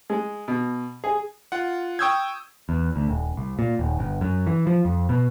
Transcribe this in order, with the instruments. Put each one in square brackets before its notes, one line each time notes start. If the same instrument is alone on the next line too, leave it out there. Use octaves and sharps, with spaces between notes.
[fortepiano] G#3
B2
G#4
[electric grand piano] F4 F#5
G5 C#6 D#6 E6 G6 G#6
[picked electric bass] E2
D2
D#1
C2
A#2
D#1
G1
F#2
E3
F3
F2
B2